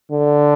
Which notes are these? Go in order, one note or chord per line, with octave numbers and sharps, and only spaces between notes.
D3